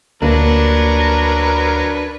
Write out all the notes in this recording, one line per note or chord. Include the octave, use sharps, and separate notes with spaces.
D2 F#3 A#3 D4 A#4 B4